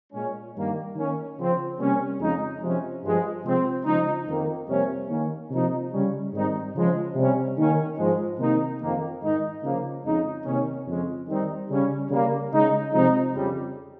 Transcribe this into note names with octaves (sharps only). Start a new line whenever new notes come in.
A#2 G#3 C#4
G2 D#3 A#3
D#3 A#3 C#4
C#3 F3 C4
C3 G3 A#3 C#4
F2 C#3 G#3 D#4
C3 F3 G#3 C#4
G2 F3 G#3
C3 F3 G#3 C4
C#3 F3 G#3 D#4
F2 D#3 A#3
F2 C3 G3 A#3 C#4
D#3 A#3 C#4
C3 F3 A#3 D#4
C#3 G3 C#4
G#2 D#3 G3 C4 D#4
C#3 F3 G#3
C3 G3 C#4
D#3 A#3 C#4
G#2 F3 G#3
C3 D#3 A#3 D#4
F2 D#3 A#3
G#2 D#3 G#3 D#4
C#3 F3 A#3
F2 C#3 G#3 D#4
C3 D#3 A#3 C#4
F2 C#3 G#3 C#4
D#3 G3 C4 D#4
C#3 G3 C#4
C#3 G3 A#3
C#3 G#3 D#4
C3 F3 G#3 C4 D#4
F2 C#3 G3